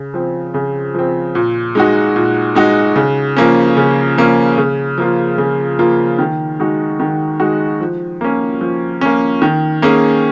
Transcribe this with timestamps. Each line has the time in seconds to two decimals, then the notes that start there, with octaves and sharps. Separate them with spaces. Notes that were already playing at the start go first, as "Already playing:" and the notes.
Already playing: C#3
0.14 F3 C4
0.54 C#3
0.94 F3 C4
1.35 A#2
1.75 G#3 D#4 F#4
2.16 A#2
2.55 G#3 D#4 F#4
2.96 C#3
3.37 F3 A#3 C#4
3.77 C#3
4.18 F3 A#3 C#4
4.58 C#3
4.98 F3 A#3 F4
5.38 C#3
5.79 F3 A#3 F4
6.19 D#3
6.59 G#3 D#4 F#4
7.00 D#3
7.40 G#3 D#4 F#4
7.80 F3
8.21 A#3 C#4
8.61 F3
9.01 A#3 C#4
9.42 D#3
9.82 A#3 C#4 G#4